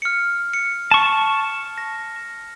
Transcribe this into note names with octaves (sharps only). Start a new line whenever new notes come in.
F6 C#7
C#7
A5 C#6
A#6